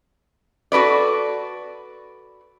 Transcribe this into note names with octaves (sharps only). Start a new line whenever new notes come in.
F#4 A4 B4 D5